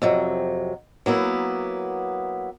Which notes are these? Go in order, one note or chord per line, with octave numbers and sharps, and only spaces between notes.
F2 C3 F#3
F#3 A#3 B3 E4